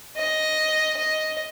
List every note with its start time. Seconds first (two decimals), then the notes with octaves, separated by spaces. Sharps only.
0.18 D#5
0.97 D#5